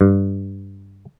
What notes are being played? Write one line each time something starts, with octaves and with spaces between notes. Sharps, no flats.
G2